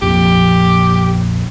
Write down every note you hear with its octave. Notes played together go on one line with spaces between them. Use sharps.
A#1 F2 A#2 G4